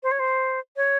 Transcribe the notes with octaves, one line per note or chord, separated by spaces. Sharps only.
C5
C#5
C5
C#5